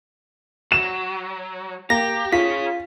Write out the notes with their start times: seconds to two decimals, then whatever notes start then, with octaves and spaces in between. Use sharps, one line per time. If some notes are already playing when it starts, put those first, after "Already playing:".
0.72 F#3 E7
1.90 A#3 G4 A#6
2.33 F4 G#4 C#5 B6